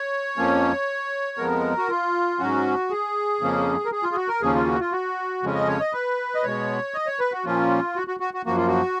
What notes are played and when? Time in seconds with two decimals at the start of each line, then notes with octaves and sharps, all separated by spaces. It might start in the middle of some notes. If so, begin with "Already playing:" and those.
Already playing: C#5
0.37 F2 F3 A#3 C#4
1.38 F2 F3 G#3 B3 A#4
1.77 F#4
1.89 F4
2.39 G#2 F#3 C#4 F#4
2.90 G#4
3.41 F2 C#3 F3 A#3 C#4
3.85 A#4
3.92 G#4
4.03 F4
4.11 G#4
4.16 F#4
4.28 A#4
4.41 D#2 C#3 F3 A#3 C#4 G#4
4.55 F4
4.66 F#4
4.80 F4
4.92 F#4
5.43 F2 C#3 F3 G#3 C#4
5.55 D#5
5.68 C#5
5.80 D#5
5.93 B4
6.35 D#5
6.43 B2 G#3 B3 C#5
6.94 D#5
7.06 C#5
7.19 B4
7.32 F#4
7.45 A#2 F3 A#3 C#4 F4
7.96 F#4
8.08 F#4
8.20 F#4
8.34 F#4
8.46 F#2 F3 A#3 F#4
8.57 F4
8.67 F#4